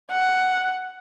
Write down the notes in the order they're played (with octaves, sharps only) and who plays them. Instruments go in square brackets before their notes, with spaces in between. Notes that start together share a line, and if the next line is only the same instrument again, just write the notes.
[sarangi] F#5